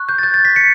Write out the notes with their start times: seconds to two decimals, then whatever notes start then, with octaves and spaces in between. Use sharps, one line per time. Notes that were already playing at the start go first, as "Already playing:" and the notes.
Already playing: C#6 F#6
0.09 G6
0.19 A6
0.23 G6
0.34 A6
0.45 B6
0.56 C#7